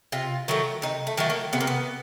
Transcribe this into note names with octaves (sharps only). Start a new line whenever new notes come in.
C3 F4
D#3 F#3 A3
C3 D#4
A3
D#3 F#3 A3
A#3
C3 B3
A#3
B3